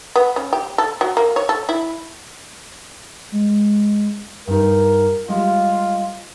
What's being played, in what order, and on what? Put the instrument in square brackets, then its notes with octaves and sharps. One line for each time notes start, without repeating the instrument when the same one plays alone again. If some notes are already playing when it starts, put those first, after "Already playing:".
[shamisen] B3
C#4
G4
A4
F#3
A#3
C#5
A4
E4
[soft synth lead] G#3
[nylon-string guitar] G2 D#4 [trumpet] A#4
[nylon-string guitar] G3 G#3 D#5 [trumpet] F4